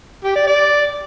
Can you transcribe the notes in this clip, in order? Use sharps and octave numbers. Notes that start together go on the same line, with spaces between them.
G4
D5
D5